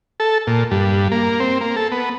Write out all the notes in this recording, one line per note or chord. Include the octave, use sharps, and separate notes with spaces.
A4
A#2
G2
A#3
C4
A#3
A4
B3